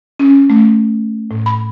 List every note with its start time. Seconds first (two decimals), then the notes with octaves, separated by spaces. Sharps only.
0.19 C#4
0.50 A3
1.31 A2
1.46 B5